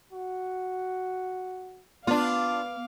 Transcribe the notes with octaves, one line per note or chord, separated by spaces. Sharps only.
F#4
B3 D4 F4 D5 F5 D6